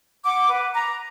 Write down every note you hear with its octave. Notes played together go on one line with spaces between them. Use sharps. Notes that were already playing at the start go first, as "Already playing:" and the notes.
F#5 D6
B4
A#5